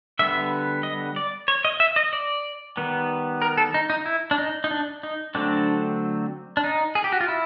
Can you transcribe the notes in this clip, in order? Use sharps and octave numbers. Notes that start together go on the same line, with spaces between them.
D3 G3 B3 E5
D#5
D5
C#5
D#5
E5
D#5
D5
D#3 G3 B3
A#4
A4
D#4
D#4
E4
D4
D#4
D#4
D4
D#4
D3 F#3 A3 C4 D4
D4
D#4
G#4
G4
F#4
F4
E4